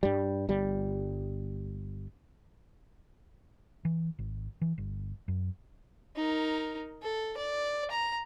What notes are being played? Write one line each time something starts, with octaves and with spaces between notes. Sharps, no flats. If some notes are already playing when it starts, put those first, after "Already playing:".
G2 G3
G1 G3
E3
G#1
E3
G1
F#2
D#4 A#4
A4
D5
A#5